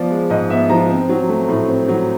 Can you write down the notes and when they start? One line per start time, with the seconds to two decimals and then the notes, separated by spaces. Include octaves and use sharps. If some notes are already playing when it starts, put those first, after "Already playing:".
Already playing: F3 B3 D5
0.10 G#3
0.30 G#2 D#5
0.50 B3 E5
0.69 F3 A#5
0.89 C4
1.09 F#3
1.29 A3
1.48 A2
1.68 C4
1.88 F#3